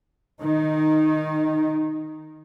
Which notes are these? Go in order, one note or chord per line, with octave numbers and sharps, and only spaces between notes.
D#3 D#4